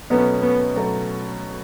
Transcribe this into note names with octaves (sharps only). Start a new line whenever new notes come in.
B2 F#3 A3 B3 C#4
B3
B2 F#3 A3